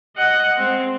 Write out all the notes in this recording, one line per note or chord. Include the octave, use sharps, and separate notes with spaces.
D#5 F#5
G#3 C4